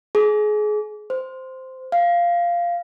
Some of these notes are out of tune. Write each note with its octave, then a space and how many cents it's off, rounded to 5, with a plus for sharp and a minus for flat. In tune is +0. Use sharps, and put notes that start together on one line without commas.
G#4 +25
C5 -5
F5 -10